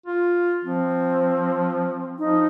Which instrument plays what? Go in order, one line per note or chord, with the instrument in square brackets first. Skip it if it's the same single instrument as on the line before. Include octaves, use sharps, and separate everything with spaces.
[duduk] F4
[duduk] F3 [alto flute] C4
[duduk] F3 [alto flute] D#4